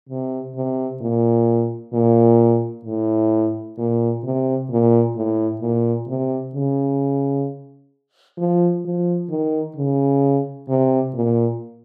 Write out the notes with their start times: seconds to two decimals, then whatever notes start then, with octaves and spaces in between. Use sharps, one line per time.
0.09 C3
0.55 C3
1.01 A#2
1.93 A#2
2.85 A2
3.78 A#2
4.23 C3
4.70 A#2
5.16 A2
5.61 A#2
6.07 C3
6.54 C#3
8.37 F3
8.85 F3
9.29 D#3
9.76 C#3
10.68 C3
11.14 A#2